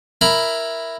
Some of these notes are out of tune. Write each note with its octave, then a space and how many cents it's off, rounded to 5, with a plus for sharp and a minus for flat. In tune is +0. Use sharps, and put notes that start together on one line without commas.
E4 +0 A#4 +0 B5 +0